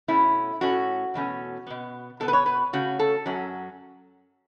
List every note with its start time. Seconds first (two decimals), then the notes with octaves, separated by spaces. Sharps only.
0.08 B2 A3 C#4 E4
0.61 A2 A3 C#4 F#4
1.14 E2 B2 F#3 A3 C#4
1.67 B2 B3
2.20 B2 B3 A4
2.28 B4
2.33 C#5
2.46 B4
2.73 C#3 A3 C#4 F#4
2.99 A4
3.26 F#2 F#3 C#4